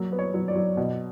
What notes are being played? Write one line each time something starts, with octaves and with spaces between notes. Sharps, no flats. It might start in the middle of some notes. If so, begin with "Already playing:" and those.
Already playing: F#3 A#3
B3
C#5
F#3
D5
F#3
B2